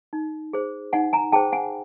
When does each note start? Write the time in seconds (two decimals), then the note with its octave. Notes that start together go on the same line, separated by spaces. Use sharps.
0.13 D#4
0.53 G#4 C5
0.93 D#4 F#5 G#5
1.13 G#5 A#5
1.32 G#4 C5 G5 A5
1.52 F#5 G#5